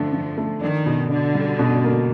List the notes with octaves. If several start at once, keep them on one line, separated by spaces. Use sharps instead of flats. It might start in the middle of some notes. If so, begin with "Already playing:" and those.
Already playing: D3 F3 A3
D3
A3
D#3 D4
B2
D3 D4
G3
B2
A#3